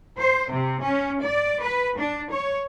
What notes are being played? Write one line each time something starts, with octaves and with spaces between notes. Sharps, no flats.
C5
C3
C#4
D5
B4
D4
C#5